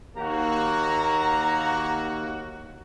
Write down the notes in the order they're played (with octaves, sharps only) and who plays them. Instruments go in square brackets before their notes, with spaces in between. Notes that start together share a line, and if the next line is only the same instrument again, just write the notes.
[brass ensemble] D#2 A#3 F#4 [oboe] A#5